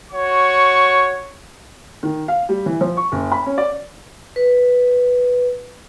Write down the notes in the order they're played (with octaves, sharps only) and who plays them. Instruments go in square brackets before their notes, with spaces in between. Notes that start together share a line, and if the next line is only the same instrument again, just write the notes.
[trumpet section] F#4 C#5 C#6
[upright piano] D#3
F5
G3
E3
F3
C#6
F#1
B5
C#4
D5
[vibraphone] B4